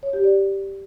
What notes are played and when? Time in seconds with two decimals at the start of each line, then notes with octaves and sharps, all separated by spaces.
0.03 C#5
0.13 G4
0.24 D5